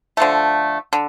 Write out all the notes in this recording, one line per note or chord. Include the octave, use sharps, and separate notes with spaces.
D3 F3 A3
D3